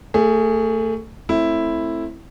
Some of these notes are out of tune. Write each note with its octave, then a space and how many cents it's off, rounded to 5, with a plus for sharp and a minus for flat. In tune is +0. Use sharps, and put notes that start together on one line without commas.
A3 +25 G#4 +0
A3 +0 C4 +15 E4 +0